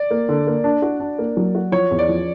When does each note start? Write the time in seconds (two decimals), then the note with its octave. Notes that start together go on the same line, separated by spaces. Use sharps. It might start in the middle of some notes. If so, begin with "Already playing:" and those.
Already playing: D5
0.11 A#3
0.29 D3
0.47 A#3
0.64 D4
0.82 F#4
1.00 D4
1.19 A#3
1.37 F#3
1.55 F#4
1.72 F3 C#5
1.91 E2
1.99 D5
2.09 F3